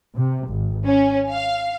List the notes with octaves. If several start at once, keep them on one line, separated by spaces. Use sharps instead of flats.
C3
G#1
C#4
F5